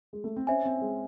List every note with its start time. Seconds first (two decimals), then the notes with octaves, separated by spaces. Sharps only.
0.13 G#3
0.24 A3
0.36 C4
0.47 C#4 C5 E5 G#5
0.65 C4
0.81 G#3